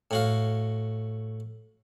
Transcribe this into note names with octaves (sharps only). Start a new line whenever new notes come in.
A2 F#4 F5